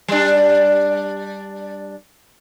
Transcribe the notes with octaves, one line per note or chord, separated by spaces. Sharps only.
G3 D4